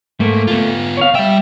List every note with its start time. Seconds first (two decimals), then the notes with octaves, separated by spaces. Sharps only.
0.20 G#2 A3 A#3
0.47 B3 F4
0.97 C#5 F5
1.15 G3 E5 G5